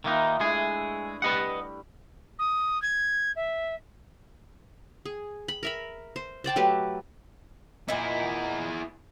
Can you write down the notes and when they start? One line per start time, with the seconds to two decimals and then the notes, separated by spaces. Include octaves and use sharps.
0.04 D#3 A#3 D#4 F4 B4 E5
0.40 G#3 A3 D4 E4 G#4
1.22 G3 B4 D#5 F#5
2.39 D#6
2.82 G#6
3.36 E5
5.05 G#4
5.48 B5
5.63 A#4 E5 B5
6.16 C5
6.44 C5 D5 G5 A5
6.56 F#3 A3 G4 B4
7.88 A#2 D#4 E4 G#4